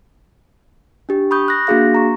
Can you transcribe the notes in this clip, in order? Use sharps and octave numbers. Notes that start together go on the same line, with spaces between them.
D4 G4
B5 C#6 D#6 G6
F#6 A#6
A#3 D4 F#4 G#4 F5 A#6
A#5 C#6